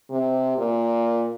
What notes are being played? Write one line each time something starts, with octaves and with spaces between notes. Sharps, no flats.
C3
A#2